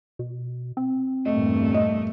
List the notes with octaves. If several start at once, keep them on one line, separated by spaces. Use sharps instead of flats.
B2
C4
E2 G2 A#2 A3 D#5
D#5